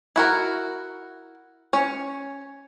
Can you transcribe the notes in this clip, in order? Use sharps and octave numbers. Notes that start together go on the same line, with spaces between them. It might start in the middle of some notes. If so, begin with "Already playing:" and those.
E4 F#4 A#4
C#4 C#5